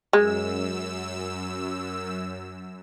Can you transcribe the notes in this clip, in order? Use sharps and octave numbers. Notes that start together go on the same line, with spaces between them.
F#2 G#3 E6